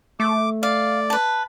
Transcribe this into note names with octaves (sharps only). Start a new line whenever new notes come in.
A3 D6
D5 F5
B4 A5